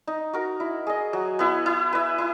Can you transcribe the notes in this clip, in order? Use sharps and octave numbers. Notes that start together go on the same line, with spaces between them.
D#4
F#4 A#4
E4
G#4 D#5
F#3
B3 E4
E4
B4 E5
E4